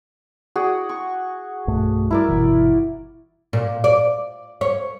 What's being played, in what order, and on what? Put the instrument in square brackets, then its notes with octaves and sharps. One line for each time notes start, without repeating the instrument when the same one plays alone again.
[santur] F#4 G#4 D5
C#6
[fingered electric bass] B1 G2 A3
[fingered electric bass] G3 [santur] E4 A#4 D5
[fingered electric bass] G1 B2 E3
[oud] A#2
D5
C#5